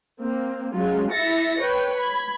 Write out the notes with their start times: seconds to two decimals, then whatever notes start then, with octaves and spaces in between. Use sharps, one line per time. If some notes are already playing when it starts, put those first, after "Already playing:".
0.20 A#3 C4
0.74 F#3 G#3 C#4 F4
1.11 E4 E5 A6 A#6 C#7
1.61 B4 C#5 G5
1.97 B5 G#6